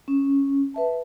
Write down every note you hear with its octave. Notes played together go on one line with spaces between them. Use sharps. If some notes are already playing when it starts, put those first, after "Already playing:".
C#4
B4 E5 A5